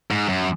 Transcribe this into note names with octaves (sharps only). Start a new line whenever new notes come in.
G#2
F#2